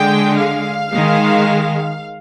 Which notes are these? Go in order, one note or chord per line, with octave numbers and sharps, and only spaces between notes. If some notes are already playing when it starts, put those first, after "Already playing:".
Already playing: D3 G#3 G5
F5
D#3 G#3